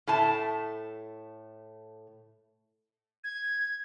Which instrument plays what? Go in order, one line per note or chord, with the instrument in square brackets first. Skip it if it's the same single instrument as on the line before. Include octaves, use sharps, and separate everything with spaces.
[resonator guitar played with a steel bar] A2 A3 A5
[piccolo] G#6